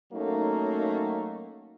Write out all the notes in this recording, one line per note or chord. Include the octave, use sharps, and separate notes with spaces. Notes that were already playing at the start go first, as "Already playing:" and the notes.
F#3 A3 A#3 C#4 D#4